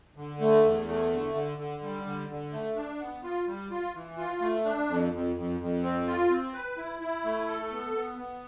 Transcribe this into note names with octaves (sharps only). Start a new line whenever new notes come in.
D3
A3
E2
A3
D3
D3
D3
G3
D3
D3
A3
D4
B3
F4
G3
F4
E3
F4
A3
D4
F2
F2
F2
F2
C4
F4
C4
B4
E4
E4
A3
A4
B3
B3
B3